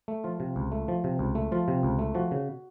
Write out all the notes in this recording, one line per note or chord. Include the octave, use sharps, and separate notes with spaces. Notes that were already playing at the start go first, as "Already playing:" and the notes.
A3
F3 F4
C3
C#2
A3
F3
C3
C#2
A3
F3 F4
C3
C#2
A3
F3 F#4
C#3